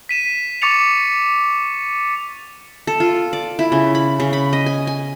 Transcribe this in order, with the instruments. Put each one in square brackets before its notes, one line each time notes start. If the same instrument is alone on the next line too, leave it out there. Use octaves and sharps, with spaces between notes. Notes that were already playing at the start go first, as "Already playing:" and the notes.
[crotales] B6 D#7 E7
C#6 D6 A6 C#7 F7
[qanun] A4
F4
D5
E4
C#3
B5
C#3
B5
D#5
G#5
G#5